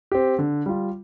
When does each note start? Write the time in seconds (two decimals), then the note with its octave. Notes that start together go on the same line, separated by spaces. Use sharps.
0.12 C4 G4
0.39 D3
0.66 G3 F4